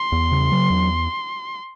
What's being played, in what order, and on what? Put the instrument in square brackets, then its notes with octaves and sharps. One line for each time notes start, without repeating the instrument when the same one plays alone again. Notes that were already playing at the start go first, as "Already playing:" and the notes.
Already playing: [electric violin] C6
[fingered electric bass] E2
C#3
F#3
E2